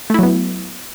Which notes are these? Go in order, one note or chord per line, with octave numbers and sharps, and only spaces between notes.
F#3 A3 B3 E4